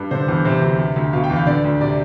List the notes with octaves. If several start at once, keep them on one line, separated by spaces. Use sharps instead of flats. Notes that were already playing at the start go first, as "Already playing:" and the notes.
Already playing: G2
D3 C5
E2
C3 C5
D2
C3
D2
B2 F5
G5
E2
F5
D3 D5
D2
C3 D5